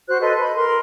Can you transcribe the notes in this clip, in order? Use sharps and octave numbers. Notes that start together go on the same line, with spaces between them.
F#4 C5 F#6
A4 B4 D#5 C6
B5
A#4 C6